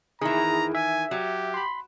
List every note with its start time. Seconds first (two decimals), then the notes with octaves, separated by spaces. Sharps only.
0.21 D#3 E3 E4 G#4 A#5
0.75 E5 G#5
1.11 F#3 G4
1.54 B5 C6